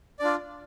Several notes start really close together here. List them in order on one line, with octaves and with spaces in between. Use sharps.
D5 D4 F4